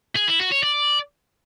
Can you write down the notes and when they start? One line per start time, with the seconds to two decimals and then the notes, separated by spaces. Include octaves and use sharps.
0.16 G#4
0.28 E4
0.39 F#4
0.51 C#5
0.63 D5